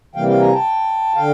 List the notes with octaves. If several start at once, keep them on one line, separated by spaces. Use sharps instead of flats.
C3 E3 G3 A#3 F5 G5
F5 G5
G#5 A#5
G5 A5
D3 F5 G5